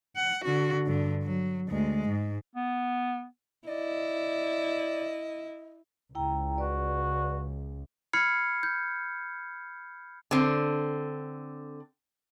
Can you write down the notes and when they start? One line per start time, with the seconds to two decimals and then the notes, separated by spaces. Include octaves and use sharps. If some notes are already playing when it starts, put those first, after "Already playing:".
0.16 F#5
0.44 D3 F#4
0.86 G2 D3
1.23 F#3
1.68 D2 G#3
2.08 G#2
2.56 B3
3.68 E4 D5 D#5
6.15 C#2 E4 G5 A#5
6.58 F#4 B4 D5
8.13 B5 F6 G#6 C7 C#7
8.63 G6
10.31 D3 C4